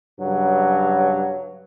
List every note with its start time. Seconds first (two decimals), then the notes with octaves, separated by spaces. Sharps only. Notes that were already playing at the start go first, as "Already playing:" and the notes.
0.20 G2 C#3 F#3